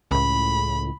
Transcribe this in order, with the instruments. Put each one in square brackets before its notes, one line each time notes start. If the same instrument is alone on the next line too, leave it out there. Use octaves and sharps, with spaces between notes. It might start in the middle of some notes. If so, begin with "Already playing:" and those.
[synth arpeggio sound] C#2 A2 [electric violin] B5